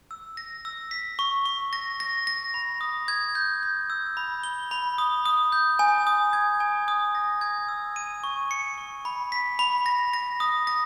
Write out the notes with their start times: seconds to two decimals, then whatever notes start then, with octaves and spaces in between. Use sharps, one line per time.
0.11 E6
0.37 A#6
0.65 E6
0.91 B6
1.19 C#6
1.45 C#6
1.73 A#6
2.00 A#6
2.27 A#6
2.54 B5
2.81 D#6
3.08 G#6
3.35 G6
3.63 G6
3.90 E6
4.17 B5
4.43 G7
4.71 B5
4.98 D#6
5.26 D#6
5.52 G6
5.79 G#5
6.07 D#6
6.33 G#6
6.60 G#5
6.88 D#6
7.15 A#6
7.41 G#6
7.68 E6
7.96 D#7
8.24 C#6
8.51 C#7
8.78 C#6
9.05 B5
9.32 B6
9.59 B5
9.86 A#6
10.13 A#6
10.40 D#6
10.67 A#6